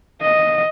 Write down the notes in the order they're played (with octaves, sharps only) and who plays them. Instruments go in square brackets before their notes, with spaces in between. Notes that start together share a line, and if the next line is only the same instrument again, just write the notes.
[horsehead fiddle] D#5